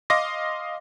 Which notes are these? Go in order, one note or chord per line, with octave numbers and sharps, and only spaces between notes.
D#5 F5 C6 D6 A#6